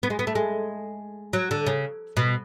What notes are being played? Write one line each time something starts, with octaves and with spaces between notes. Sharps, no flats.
B3
G#3
B3
A3
G#3
F#3
D3
C#3
B2